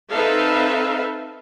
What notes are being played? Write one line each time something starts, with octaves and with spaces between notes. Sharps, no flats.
C4 D#4 A4 B4 E5 F5